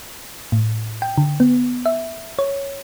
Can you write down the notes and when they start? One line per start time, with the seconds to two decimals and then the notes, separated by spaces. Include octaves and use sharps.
0.52 A2
1.02 G5
1.18 D3
1.40 B3
1.86 E5
2.39 C#5